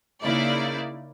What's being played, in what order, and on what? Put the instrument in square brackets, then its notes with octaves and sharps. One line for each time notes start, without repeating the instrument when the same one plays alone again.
[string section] C#3 A#3 D#4 E4 D5